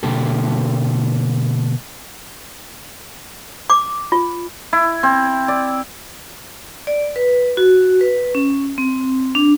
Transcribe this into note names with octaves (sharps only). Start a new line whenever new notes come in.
B2 D3 A#3 G4 A4
D6
F4
E4
C4
D5
D5
B4
F#4
B4
C#4
C4
D4